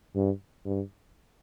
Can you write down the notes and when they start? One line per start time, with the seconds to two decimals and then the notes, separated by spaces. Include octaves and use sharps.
0.15 G2
0.66 G2